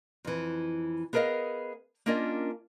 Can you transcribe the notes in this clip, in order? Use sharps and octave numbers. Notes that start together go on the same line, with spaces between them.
F2 E3
B3 G#4 A#4 C#5 D#5 F5
A#3 C#4 D4 F4 A#4 D#5